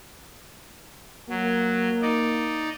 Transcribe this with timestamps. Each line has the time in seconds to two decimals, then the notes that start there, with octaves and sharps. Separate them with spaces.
1.29 F#3 A#3
2.02 D#4 D5